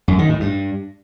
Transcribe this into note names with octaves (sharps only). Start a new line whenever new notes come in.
F#2
D#3
A2
G2